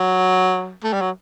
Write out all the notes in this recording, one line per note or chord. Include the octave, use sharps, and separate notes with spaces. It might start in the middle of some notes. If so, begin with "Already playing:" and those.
Already playing: F#3
A3
G3
F#3